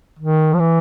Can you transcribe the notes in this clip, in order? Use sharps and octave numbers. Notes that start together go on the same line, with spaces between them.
D#3
F3
E3